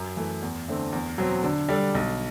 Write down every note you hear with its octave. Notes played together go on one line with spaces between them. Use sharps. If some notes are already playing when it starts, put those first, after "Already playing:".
Already playing: F#2
E3 A3
E2
D3 A3 C4
E2
B2 F#3 C4
D3
G3 D4 A4
B1